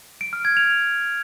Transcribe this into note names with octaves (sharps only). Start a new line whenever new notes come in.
D7
F6
G#6
F7